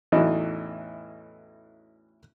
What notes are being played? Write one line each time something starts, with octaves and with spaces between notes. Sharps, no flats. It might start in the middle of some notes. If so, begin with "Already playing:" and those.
A1 E2 E3 F#3 D#4 D#5